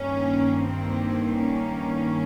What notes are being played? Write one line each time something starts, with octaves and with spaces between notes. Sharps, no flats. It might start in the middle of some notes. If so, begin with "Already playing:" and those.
Already playing: G2 D#3 A#3 C#4
C4
C#4